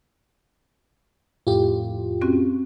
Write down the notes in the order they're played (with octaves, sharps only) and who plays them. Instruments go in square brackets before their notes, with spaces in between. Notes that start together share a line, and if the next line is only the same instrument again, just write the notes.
[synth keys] F2 A2 [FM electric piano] F4 G4
[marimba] C4 C#4 F#4